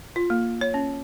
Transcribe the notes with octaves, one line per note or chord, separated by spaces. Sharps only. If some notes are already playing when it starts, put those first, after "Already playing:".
F4
A#3
C#5
C#4